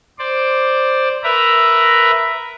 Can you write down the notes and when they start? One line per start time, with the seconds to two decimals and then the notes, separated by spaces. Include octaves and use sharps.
0.19 C5 D5
1.23 A#4 B4 E5 A#5